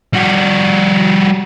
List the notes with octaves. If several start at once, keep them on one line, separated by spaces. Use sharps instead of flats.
G3 F#4